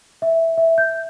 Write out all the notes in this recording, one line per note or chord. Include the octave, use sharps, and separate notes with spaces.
E5
E5
G6